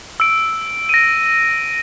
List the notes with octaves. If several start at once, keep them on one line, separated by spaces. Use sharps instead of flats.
E6 D7
A#6 D#7